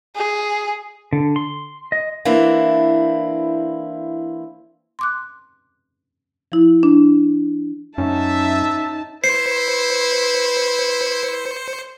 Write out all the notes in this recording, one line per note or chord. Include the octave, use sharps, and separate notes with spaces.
G#4
D3
C6
D#5
E3 A#3 C4 D4 E4
C6 D6 F#6
F3 E4
D4
F#2 C#4 D#4 E5 A5
E4 B4 C5 C7 C#7